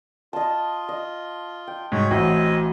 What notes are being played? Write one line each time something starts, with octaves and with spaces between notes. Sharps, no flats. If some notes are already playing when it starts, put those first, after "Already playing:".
F4 D#5 A5
D#5
G5
G#2 F#4 C#5
A1 C4 F#4 D#5